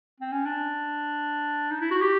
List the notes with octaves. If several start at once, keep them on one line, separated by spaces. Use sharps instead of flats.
C4
C#4
D4
D#4
E4
F#4
G4